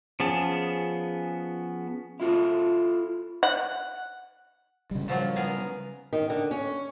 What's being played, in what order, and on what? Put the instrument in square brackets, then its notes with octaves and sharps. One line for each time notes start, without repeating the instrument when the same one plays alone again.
[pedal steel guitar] F3 B3 C#4 G#4 A5
[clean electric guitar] E4 F4 A4
[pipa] F#5
[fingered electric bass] C#3 G3
[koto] A#2 F3 F#3
B3 G#4 A#4
[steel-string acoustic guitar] D#3
D3
C#4